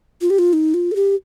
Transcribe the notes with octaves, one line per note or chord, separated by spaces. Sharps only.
F4
G4
F4
D#4
F4
A4
G4